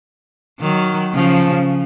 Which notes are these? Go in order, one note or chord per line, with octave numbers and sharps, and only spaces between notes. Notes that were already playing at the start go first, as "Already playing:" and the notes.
D#3 F#3
C#3 F3